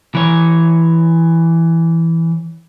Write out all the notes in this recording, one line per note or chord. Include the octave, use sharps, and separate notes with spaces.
E3 C#5